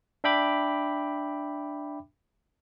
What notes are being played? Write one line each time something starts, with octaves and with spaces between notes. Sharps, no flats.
D4 E5 G5 B5 D6